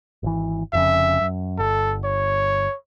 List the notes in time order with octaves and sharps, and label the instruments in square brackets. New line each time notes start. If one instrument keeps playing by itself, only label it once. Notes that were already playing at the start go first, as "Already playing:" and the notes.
[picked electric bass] G#1 E3
[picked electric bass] F1 F2 C#3 [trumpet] E5
[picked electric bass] F#2
[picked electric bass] G1 [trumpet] A4
[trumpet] C#5